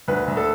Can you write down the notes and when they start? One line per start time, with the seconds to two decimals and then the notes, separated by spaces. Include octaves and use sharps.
0.08 D2 B4
0.28 D2
0.37 A4